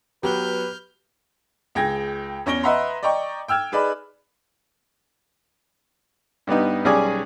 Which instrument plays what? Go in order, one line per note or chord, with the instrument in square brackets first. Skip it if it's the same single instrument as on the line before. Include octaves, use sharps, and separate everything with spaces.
[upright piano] F#3 B3 [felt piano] G4 [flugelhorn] B4 [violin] F6 G6
[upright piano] C#2 G#4 G5 G#6 A#6
E2 C#4 C#6 A#6 D7 G7
B4 D#5 E5 F#5 A#5 C6
D5 D#5 G5 A#5 C#6
G5 E6 F6 G#6
D#4 G#4 B4 D5 B5
[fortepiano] G2 G3 B3 D#4
B1 G3 C#4 G#4 D5 G#5